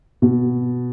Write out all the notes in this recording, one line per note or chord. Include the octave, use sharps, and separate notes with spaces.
B2